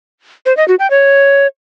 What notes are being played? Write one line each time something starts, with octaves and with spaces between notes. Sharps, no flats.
C5
D#5
F#4
G5
C#5